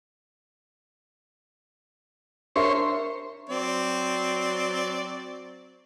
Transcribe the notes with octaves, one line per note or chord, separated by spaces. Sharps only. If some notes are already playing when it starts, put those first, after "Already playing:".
D4 A#4 C5 C#5 E5
F#3 C4 D5